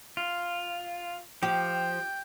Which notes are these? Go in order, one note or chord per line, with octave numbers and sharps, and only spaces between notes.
F4
F3 G4 G5